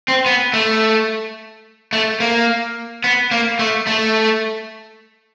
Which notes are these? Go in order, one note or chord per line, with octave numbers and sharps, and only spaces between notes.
C4
B3
A3
A3
A#3
B3
A#3
A3
A3